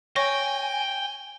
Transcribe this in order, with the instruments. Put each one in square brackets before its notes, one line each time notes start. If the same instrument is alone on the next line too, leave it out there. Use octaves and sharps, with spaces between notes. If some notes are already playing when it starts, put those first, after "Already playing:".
[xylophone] C#5 C#6 A#6 [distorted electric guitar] G5 [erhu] G#5